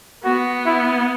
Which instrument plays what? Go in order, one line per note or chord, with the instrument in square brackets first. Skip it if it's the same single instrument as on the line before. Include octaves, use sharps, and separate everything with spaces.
[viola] B3 [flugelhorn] F#4
[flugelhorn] E4